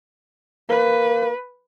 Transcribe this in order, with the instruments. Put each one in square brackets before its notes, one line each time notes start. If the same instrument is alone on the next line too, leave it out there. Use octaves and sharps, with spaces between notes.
[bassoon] A#3 [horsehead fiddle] B4